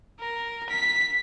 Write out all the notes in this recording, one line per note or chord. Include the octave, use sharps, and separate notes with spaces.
A#4
B6